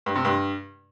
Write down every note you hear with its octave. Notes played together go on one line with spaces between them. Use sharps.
G2
C3
G2